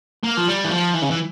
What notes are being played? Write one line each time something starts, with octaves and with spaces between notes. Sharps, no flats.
A#3
F3
G3
E3
F3
E3
C#3
E3